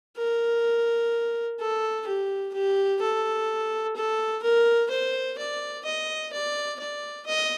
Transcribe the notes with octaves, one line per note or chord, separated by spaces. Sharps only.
A#4
A4
G4
G4
A4
A4
A#4
C5
D5
D#5
D5
D5
D#5